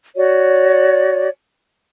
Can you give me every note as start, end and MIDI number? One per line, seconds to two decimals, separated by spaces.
0.17 1.29 66
0.17 1.29 73
0.17 1.29 74